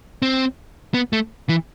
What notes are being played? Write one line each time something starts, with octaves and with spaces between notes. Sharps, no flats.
C4
B3
A3
E3